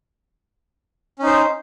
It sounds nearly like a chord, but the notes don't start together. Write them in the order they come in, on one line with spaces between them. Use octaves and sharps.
C#4 D#4 C5